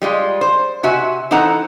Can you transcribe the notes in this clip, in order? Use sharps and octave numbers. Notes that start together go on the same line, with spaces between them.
G3 G#3 F4
C5
C3 F#4 E5 G#5
E3 C4 D#4 A4 F#5 A#5